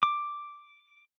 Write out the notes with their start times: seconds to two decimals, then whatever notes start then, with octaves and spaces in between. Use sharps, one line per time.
0.03 D6